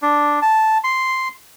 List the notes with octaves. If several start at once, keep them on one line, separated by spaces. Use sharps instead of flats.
D4
A5
C6